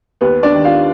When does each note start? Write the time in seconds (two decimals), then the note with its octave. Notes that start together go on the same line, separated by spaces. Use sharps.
0.21 D#2 B3 B4
0.43 D4 D5
0.54 D#3
0.65 F4 F5